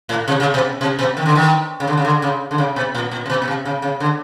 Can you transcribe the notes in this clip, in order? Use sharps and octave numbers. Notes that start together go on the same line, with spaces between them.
A2
C3
C#3
B2
C3
B2
D#3
D3
D#3
C#3
D3
C#3
D3
C#3
D3
C#3
B2
A#2
A#2
C3
B2
B2
C3
C#3
C#3
D3